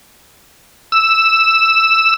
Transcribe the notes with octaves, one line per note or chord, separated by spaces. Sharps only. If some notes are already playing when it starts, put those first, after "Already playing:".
E6